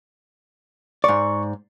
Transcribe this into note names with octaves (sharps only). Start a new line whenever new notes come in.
G#2 D5 C#6